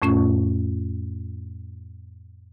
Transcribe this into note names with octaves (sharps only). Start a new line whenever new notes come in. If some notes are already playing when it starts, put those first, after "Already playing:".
F2 A2 A3 C#4 F4 C#6